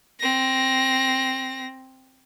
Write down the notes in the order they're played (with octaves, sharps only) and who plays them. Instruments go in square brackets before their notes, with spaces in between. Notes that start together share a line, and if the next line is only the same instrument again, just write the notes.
[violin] C4 A#6